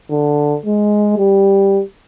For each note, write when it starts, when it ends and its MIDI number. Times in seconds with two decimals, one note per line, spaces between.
0.11 0.56 50
0.66 1.18 56
1.18 1.81 55